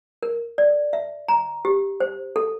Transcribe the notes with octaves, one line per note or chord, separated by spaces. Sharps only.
A#4
D5
E5
A#5
G4
C5
A4